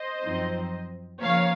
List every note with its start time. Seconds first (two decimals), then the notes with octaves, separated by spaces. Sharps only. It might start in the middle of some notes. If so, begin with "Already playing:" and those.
Already playing: C5 D#5
0.21 F#2 F3 C4 D#4
1.21 C#3 F3 A#3 C#4 C#5 F5